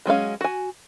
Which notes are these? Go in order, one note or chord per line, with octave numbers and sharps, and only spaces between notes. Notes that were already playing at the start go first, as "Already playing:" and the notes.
F#3 G#3 C#4 F5
F#4 G#5